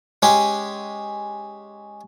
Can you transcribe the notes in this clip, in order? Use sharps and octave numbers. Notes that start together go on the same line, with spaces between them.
G#3 C#4 G4